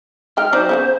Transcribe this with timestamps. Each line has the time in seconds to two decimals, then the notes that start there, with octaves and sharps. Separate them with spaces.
0.37 G#3 D#4 G5 F6
0.53 F#3 D#4 C5 D5
0.69 C#3 E3 B3